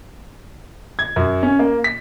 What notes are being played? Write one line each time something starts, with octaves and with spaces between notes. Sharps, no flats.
G#6
F#2
C#4
A#3
B6